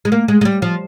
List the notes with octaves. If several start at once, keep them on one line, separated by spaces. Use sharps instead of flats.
G#3
A#3
G#3
G#3
G3
F3